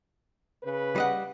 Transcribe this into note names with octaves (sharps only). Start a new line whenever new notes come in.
C#3 B4
G3 D#5 F#5